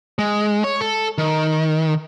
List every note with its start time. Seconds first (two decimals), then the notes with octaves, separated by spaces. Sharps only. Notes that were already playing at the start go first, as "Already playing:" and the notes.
0.19 G#3
0.64 C#5
0.81 A4
1.18 D#3